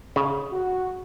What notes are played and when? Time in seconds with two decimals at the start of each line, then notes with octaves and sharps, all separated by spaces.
0.16 C#3
0.52 F#4